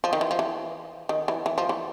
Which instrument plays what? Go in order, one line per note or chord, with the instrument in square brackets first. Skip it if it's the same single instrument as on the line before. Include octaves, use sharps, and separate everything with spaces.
[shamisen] F3
D#3
E3
F3
E3
D#3
E3
E3
F3
E3